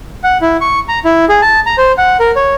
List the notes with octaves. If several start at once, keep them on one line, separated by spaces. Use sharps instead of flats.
F#5
E4
C#6
A#5
E4
G#4
A5
A#5
C5
F#5
A#4
C#5